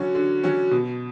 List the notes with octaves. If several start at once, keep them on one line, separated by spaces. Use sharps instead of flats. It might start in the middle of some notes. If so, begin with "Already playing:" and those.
Already playing: D3 F#3 C#4 F#4
D3
F#3 C#4 F#4
B2